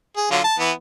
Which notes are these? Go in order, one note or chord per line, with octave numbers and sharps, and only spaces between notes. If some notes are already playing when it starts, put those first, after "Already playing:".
G#4
D3 F#3 F4
A5
E3 B3